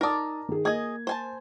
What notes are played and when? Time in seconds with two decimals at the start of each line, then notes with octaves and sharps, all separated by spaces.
0.01 D#4 A#4 D5 A5 D#6
0.49 D#3 G#4
0.65 A#3 G#4 D#5 G#6
1.07 C5 G#5 A5